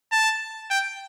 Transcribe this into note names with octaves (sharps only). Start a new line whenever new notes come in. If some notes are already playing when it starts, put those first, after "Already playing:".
A5
G5